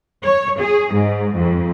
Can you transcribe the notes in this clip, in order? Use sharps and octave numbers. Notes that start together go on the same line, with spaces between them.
C#5
G#4
G#2
F2